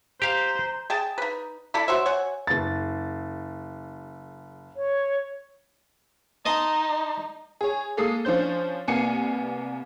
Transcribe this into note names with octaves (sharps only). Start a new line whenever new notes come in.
G4 C5 F5 A#5
G#4 G5 A5
D#4 B4
E4 A4 D5 B5
F#4 C5 C#5 E5
C#5 F#5 G#5
F#1 A6
C#5
D#4 D#5 A5 C6
G#4 C#5
G#3 A#3 A4 D#6 C7
F3 C#4 D4 C5 G6
C2 A#3 B3 G#5 C7 C#7